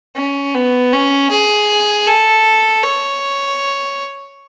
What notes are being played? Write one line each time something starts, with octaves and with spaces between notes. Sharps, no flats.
C#4
B3
C#4
G#4
A4
C#5